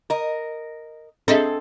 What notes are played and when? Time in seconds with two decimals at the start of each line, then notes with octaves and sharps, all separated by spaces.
0.10 A#4 D#5
1.28 C4 D4 G#4 A4 D#5 E5